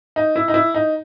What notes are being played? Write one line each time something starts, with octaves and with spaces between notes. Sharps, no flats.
D#4
E4
D#4
E4
D#4